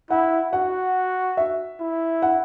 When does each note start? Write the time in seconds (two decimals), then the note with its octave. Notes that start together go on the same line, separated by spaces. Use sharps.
0.11 E4 F#5
0.53 F#4 F#5
1.37 E5
1.80 E4
2.22 F#5